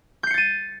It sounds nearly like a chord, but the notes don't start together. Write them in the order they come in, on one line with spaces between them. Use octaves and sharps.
G6 C7 C#7 A6 D#7